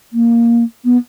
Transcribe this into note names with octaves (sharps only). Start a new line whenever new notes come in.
A#3
B3